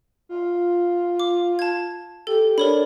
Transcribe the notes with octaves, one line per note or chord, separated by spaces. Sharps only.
F4
D6
A5 G#6
G4 A4
D4 A#4 C#5 B5